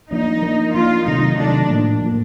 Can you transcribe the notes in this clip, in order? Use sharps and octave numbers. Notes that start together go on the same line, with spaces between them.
F3 A#3 D4 D#4
F3 A#3 D4
F3 A#3 D4 F4
C3 D#3 F#3 A3 D#4
C3 D#3 F#3 A3 D4
A2 F3 A#3
A2 F3 A#3